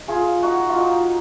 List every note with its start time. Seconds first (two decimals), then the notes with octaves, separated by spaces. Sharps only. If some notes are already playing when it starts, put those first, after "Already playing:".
Already playing: D#4
0.08 F4 G#4
0.43 D#4 F#4
0.69 F4
0.78 D#4